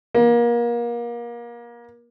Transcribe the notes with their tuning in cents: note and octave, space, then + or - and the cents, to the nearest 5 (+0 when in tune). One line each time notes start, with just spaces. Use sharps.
A#3 +30